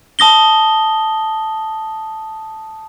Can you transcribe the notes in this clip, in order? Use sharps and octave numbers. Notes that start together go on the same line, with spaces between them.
A5 D#6 A#6 G7